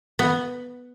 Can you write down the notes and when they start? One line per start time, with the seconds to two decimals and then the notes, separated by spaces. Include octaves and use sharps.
0.19 B3